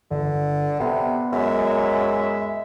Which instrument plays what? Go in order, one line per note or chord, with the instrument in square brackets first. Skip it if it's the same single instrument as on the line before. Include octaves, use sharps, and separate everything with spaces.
[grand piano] G1 [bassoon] D3
[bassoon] C3 [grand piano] B3 D5 F#5
[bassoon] F#2 [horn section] G#3 E5